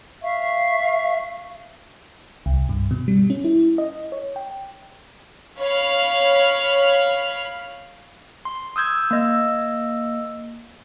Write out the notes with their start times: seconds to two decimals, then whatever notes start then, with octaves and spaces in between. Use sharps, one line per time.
0.22 E5 F5 C#6
2.46 C2
2.69 G2
2.91 B2
3.08 G3
3.30 C#4
3.44 E4
3.78 D#5
4.12 C#5
4.36 G5
5.59 C#5 F5 B5 F6
8.45 C6
8.76 D#6 E6 G6 G#6
9.11 A#3 D#5 E6